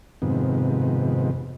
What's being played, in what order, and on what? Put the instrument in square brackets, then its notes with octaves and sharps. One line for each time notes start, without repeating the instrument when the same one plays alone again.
[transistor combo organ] F2 G#2 C3 D#3 B3